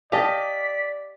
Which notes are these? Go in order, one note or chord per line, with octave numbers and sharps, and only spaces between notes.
G4 D5 D#5 F5 A5 B6